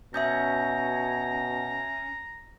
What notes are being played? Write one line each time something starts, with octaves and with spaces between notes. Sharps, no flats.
B2 C#4 E5 A#5 D#6 G6